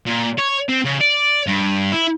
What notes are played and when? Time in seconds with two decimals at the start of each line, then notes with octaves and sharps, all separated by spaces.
0.06 A#2
0.38 C#5
0.69 C4
0.85 C#3
1.00 D5
1.47 G2
1.92 E4